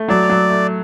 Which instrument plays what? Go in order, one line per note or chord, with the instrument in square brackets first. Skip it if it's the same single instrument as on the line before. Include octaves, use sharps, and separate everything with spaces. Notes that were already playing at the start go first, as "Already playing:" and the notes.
Already playing: [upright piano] A3
[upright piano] F#3 [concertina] D5
[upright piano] F#3
A3